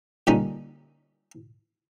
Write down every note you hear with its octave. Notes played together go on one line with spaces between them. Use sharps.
A#2 D3 G3 C#4 D#4